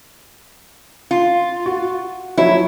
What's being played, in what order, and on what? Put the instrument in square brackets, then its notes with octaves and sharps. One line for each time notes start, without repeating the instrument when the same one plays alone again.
[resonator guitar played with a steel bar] F4
[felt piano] F#4
[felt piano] F3 F#3 C#5 [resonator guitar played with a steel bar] E4